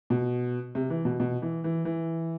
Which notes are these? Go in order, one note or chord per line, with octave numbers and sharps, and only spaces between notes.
B2
C3
E3
B2
B2
E3
E3
E3